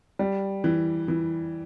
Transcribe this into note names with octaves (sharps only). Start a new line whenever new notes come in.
G3
E3
E3